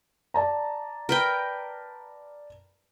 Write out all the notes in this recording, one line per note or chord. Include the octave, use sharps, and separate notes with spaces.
D5 A5 A#5
A#4 B4 G5